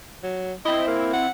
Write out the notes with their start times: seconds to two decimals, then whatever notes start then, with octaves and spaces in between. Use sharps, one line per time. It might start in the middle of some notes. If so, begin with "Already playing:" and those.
0.24 F#3
0.65 C4 E4 D#5
0.87 A#3
1.13 F#5